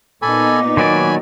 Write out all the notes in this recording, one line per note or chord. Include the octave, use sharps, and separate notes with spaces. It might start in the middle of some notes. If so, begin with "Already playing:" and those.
A#2 B3 D#4 A4 G#5 B5 D6
D#3 F#3 D5 G#5 B5